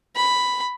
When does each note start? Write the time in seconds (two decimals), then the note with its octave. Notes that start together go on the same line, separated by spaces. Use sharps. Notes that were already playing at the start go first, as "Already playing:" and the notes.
0.16 B5